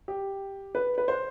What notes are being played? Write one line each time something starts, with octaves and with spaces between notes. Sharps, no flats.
G4
B4
B4
C5